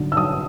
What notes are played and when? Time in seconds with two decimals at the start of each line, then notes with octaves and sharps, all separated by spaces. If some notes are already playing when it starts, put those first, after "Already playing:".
Already playing: D3 F#3
0.12 E6
0.17 F#3 D#6